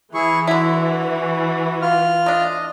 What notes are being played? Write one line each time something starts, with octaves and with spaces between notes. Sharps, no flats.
E3 E4 G#4 C#6
D3 E4 F#4
F4 F6
A3 D4 D#5